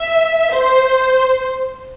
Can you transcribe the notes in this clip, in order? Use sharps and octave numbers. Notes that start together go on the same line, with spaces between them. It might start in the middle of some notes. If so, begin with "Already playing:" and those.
Already playing: E5
C5